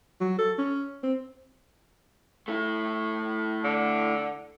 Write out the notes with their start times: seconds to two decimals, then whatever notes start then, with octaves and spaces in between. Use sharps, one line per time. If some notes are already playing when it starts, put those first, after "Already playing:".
0.20 F#3
0.38 A4
0.58 C#4
1.03 C4
2.48 A3 E4
3.64 D3